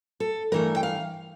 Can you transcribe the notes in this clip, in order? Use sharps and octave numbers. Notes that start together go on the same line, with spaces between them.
A4
G2 E3 A3 A#4
G5
F5